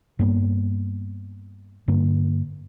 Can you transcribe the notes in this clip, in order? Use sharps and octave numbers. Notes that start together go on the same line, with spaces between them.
G2 G3 A#3 B3
G2 D3 A#3